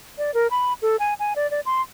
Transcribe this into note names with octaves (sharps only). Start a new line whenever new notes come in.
D5
A#4
B5
A4
G#5
G#5
D5
D5
C6